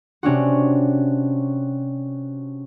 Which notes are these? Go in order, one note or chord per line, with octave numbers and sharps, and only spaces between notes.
C3 C#4 D4 F#4